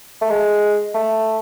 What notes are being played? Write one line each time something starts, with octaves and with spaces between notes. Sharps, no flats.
A3
G#3
A3